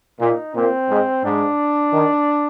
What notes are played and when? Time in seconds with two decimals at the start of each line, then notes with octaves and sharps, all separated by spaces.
0.20 A#2 D#4
0.55 A#2 C4
0.90 G#2
1.24 G#2 D4
1.93 D#3